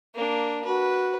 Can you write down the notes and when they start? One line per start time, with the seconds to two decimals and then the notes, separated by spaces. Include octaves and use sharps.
0.15 A#3 D4
0.65 F#4 B4